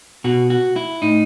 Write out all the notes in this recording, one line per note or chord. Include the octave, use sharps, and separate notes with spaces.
B2 F#4
F#4
E4
A2 D#4